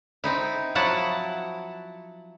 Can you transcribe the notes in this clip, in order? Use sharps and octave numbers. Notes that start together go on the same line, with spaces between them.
C4 D#4 E4
F3 F#3 E4 F#5 A5